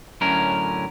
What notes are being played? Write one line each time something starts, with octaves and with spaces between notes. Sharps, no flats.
F#2 A2 D3 C#4 A#4